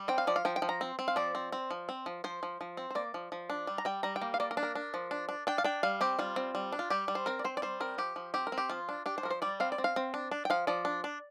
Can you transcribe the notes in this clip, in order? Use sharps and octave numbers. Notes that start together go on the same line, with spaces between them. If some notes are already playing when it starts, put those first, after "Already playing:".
Already playing: G3
C4 G5
F5
F3 D5
F5
F3 G5
G5
F3
A#5
C4
C4
F5
F3 D5
C4
C4
F3
C4
F3
F3 C5
F3
F3
C4
C5
A#3 D5
F3
F3
D4
G3
A#5
G3 G5
G3 A#5
G5
A#3
F5
A#3 D5
A#4
D4
A#4
D4
F3
D4
D4
D4 G5
F5
D4 G5
G3 F5
C4 G4
G3 F4
C4
G3
D4
F4
G3 G4
G3
C5
C4 A#4
D5
C4 C5
D5
G3 C5
C4 A#4
F3 G4
F3
C4 G4
A#4
C4
G4
F3 F4
D4
D4 G4
C5
F3 A#4
C5
G3 D5
C4 F5
D5
C4
F5
C4
D4
D4
G5
F3 F5
F3 D5
D4
D4